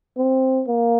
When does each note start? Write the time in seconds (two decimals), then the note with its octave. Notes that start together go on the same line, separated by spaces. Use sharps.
0.17 C4
0.68 A#3